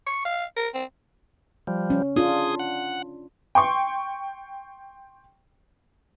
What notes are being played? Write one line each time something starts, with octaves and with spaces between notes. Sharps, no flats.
C#6
F5
A#4
C4
F3 G3
C#4
D4 F4 G#4 D#6
F#5
G5 C6 C#6